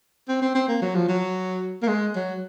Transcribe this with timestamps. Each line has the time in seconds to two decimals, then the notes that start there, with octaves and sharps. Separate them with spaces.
0.28 C4
0.42 C4
0.54 C4
0.68 A#3
0.81 F#3
0.95 F3
1.08 F#3
1.82 A#3
1.88 G#3
2.15 F#3